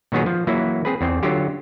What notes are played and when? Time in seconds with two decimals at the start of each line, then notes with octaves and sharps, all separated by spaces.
0.12 A#2 D#3 F#3 B3 G#4
0.26 F3
0.47 E3 F#3 A#3 E4
0.85 C4 G#4 B4
1.01 E2 C4
1.23 D3 F#3 F4 G4